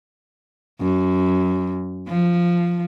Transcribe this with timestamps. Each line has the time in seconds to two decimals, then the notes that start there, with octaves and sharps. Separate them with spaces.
0.81 F#2
2.09 F3